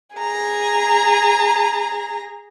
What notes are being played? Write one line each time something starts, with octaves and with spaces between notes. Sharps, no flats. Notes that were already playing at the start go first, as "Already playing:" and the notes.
G#4 A#5